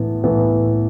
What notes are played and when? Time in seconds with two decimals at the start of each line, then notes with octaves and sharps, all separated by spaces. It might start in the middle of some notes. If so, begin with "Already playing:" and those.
Already playing: A2 E3 B3
0.24 A2 E3 B3